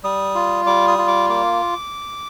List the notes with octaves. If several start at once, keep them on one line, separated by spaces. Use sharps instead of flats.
G3 D#6
F4
G3 D6
D#6
F4
D6
A#3 D6